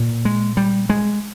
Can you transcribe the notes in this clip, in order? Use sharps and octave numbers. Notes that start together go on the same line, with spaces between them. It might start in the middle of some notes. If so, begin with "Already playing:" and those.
Already playing: A#2
G#3
G3
G#3